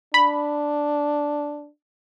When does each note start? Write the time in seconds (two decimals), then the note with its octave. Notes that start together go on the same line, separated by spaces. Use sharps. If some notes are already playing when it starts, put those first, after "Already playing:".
0.14 D4 B5